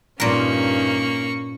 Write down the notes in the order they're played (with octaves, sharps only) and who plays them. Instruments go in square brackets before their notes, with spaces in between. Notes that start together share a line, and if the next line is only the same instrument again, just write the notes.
[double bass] G2 D#4 [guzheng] A#2 A#4 [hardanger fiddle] A#3 C#6 [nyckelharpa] C#4